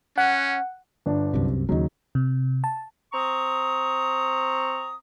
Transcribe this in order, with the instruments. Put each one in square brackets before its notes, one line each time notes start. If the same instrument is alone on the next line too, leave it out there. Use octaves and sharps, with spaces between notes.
[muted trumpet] C#4 [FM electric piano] F#5
[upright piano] G1 D4
[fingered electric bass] C2 F#2 C3
[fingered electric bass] D#2 C#3 [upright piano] F#3 D#4
[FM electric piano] C3
A5
[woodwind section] C4 A#5 C#6 D#6